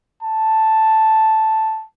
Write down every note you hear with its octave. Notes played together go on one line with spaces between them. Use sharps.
A5